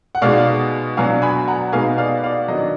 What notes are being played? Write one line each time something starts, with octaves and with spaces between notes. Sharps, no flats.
F#5
B2 G#3 D#4 D5 F5
B2 F#3 D4 F5 G#5
G#5 B5
F#5 A#5
B2 G#3 B3 D#4 F5 G#5
D5 F5
D5 F5
D#3 F#3 D4 D#5
D5